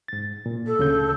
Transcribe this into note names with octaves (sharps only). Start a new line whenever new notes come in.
G#2 A6
A#2
A4
D2 C#3 G6